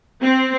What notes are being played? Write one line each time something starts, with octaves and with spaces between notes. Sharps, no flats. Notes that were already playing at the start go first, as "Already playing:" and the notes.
C4